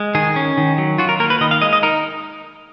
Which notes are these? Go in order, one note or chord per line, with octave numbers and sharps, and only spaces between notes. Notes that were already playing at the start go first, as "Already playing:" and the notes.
Already playing: G#3
D#3 G#4
C#4
D#3
F#3
F4 F#4
A#4
A#3 A#4
B4
D#3 D#5
F5
G#3 D#5
D#5
D#4 A#4